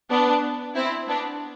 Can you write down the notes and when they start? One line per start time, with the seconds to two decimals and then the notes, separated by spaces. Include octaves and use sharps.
0.10 B3 D4
0.75 C4 E4
1.07 B3 D4